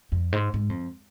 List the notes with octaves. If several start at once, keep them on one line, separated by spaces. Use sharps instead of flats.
F2
G#2
G#2
F2